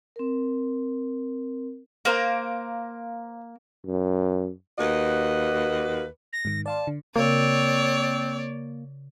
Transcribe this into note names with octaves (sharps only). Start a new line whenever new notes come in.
C4 A#4
A#3 A#4 C5 F5
F#2
D#2 A#3 F#4 B4 D#5
A#6
G#2 D#3
D5 F5 A5 C6
D3
C#3 A#3 C4 F#4 A#4 C#5 D5